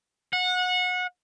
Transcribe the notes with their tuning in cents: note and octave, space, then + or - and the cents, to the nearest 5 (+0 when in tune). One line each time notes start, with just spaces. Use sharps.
F#5 -25